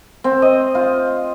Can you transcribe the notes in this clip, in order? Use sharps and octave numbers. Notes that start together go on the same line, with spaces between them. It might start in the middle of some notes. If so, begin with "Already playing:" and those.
C4
D#5
F4